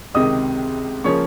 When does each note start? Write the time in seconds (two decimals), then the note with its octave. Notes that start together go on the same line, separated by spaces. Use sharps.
0.15 C#2 C3 D#3 D#5 D#6
1.04 C#3 F3 A#3 C#4 C#5 C#6